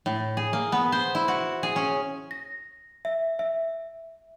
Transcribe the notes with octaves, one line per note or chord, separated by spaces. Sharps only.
A2
G#4
A#3
B3
C5
E4
F#4
G#4
C#4
A#6
E5
E5